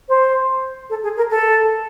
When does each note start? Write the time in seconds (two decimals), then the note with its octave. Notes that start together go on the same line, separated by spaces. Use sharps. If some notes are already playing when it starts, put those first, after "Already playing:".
0.09 C5
0.90 A4
1.03 G#4
1.17 A#4
1.30 A4